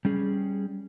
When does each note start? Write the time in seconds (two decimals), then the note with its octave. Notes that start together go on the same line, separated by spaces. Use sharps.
0.05 G3 C#4 G#4